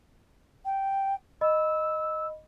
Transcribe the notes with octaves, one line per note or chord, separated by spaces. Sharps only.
G5
D#5 B5 E6